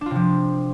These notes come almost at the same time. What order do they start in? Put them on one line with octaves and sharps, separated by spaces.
D4 F4 C3 F3